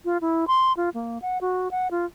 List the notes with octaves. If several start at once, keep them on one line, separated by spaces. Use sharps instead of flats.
F4
E4
C6
F4
A#3
F#5
F#4
F#5
F4